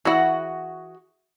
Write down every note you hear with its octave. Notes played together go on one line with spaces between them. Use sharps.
E3 E4 F#4 G#4 F#5